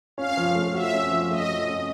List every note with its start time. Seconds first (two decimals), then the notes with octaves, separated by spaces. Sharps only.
0.17 C#4 F5
0.37 F3
0.55 A3
0.74 F#4 E5
0.93 C#4
1.11 F3
1.31 A3 D#5
1.49 F#4
1.68 C#4